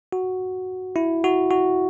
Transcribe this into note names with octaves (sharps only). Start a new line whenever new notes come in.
F#4
E4
F#4
F#4